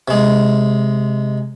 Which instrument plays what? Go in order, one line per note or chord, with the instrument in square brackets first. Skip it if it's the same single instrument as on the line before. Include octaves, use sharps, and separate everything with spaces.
[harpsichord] C3 G#3